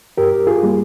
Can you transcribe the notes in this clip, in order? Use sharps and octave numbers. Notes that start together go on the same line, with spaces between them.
G2 G4 A#4
F4 G#4
G3 A#3